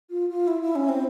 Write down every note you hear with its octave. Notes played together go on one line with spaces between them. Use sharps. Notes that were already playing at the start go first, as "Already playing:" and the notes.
F4
F4
E4
E4
C#4
C4